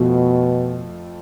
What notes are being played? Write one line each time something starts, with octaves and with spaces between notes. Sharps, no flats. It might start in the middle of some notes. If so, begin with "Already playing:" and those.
Already playing: F2 B2 F3 A3